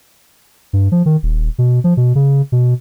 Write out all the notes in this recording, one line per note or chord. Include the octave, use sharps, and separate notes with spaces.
G2
F3
D#3
D#1
B2
F3
B2
C#3
B2